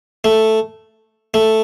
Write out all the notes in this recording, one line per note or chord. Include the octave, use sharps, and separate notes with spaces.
A3
A3